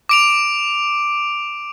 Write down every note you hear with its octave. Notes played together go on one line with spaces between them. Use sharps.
D6 D7 F7